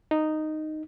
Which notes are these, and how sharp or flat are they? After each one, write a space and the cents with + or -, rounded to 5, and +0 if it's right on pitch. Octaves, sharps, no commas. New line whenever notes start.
D#4 -5